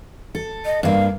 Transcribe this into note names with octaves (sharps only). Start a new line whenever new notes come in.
A4
D#5
G2 A#3 F5